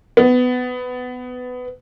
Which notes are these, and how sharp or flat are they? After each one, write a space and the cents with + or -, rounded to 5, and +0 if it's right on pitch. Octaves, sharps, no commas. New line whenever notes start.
B3 +15